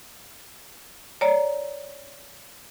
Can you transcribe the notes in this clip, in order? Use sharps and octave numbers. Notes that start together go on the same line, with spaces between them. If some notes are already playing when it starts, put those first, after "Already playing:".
C#5 D5 A#5